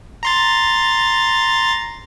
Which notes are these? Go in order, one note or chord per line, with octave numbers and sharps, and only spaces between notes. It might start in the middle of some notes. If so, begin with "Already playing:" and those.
A#5 C6 A6